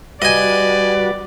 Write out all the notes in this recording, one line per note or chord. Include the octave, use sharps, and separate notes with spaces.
G3 F#4 B4 D5 D#5 G#5